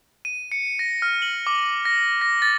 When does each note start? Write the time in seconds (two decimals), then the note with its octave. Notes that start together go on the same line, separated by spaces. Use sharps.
0.25 D#7
0.52 C#7
0.79 A#6
1.02 F6
1.22 F#7
1.47 D6
1.85 A#6
2.21 A#6
2.42 A6